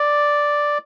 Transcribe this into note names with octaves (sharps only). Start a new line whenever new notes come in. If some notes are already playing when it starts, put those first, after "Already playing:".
Already playing: D5